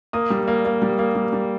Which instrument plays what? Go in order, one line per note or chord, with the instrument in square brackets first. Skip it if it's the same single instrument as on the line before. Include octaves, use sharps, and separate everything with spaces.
[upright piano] A#3 D#6
G3
A#3
A#3
G3
A#3
G3
G3